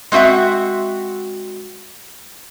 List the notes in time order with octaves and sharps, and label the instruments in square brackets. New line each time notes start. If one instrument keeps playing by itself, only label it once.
[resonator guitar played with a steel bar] G#3 C4 F#4 E5 F#5